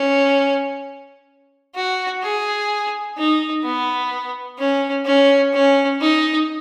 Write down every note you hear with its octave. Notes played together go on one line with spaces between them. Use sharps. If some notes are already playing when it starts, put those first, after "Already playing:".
Already playing: C#4
F#4
G#4
D#4
B3
C#4
C#4
C#4
D#4